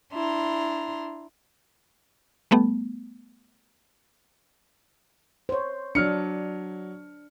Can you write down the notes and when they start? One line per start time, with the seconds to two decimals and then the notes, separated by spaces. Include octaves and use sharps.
0.13 D4 E4 A#5 C6
2.51 G3 A3 B3
5.49 C5 C#5
5.95 F#3 D4 F6 C#7